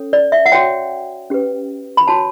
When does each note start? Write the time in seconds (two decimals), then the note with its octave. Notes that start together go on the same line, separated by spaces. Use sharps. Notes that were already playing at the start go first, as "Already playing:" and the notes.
Already playing: C#4 A4 C#5
0.13 D5
0.32 E5
0.46 F#5
0.52 F#4 C#5 G5
1.30 C#4 G4 B4
1.97 B5
2.08 F#4 C#5 A5